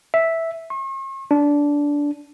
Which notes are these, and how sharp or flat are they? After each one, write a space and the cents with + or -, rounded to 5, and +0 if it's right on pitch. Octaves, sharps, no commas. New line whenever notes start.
E5 -5
C#6 -45
D4 -15